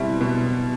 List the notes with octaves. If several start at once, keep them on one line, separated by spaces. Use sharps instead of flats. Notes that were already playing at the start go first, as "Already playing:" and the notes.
Already playing: B2 G3 C4 E4
B2